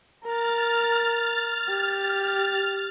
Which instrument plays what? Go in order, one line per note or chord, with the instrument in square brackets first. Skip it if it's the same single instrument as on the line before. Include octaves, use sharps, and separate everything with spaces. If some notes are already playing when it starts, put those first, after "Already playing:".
[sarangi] A#4 [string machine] F6 A6
[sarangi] G4